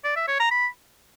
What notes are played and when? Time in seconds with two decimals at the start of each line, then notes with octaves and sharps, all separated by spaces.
0.04 D5
0.16 E5
0.28 C#5
0.40 A#5
0.51 B5